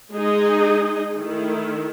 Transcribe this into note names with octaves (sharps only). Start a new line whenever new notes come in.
G#3 D#4 G#4 D#5
D#3 A3 E4